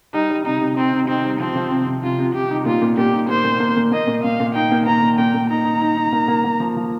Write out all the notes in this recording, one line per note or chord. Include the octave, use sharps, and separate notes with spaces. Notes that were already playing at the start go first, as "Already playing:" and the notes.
G3 D#4
G3
C3 D#4
C3
C4 D#4
C3
C4 D#4
G3
F3 C4
F3
C3
C3
C3 F4
C3
C3 G4
D#4
A#2 F4
A#2
A#2 G4
D#4
A#3 C5
A#2
A#3
A#2
A#3 D#5
A#2
A#2 F5
A#2
D#4 G5
A#3
A#3 A#5
A#2
A#2 G5
A#2
D#4 A#5
D#4
D#4
D#4
A#3
A#3
A#3
F3
F3